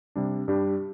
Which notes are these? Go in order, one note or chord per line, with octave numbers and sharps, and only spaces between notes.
C3 G3 D4
G2 G3 D4 G4